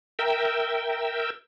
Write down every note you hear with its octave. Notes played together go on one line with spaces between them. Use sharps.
A#4 E5 G5